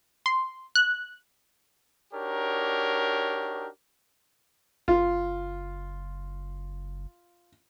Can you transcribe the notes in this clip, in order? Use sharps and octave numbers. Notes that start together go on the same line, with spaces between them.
C6
F#6
D4 D#4 F#4 G4 A#4 C#5
F#1 F4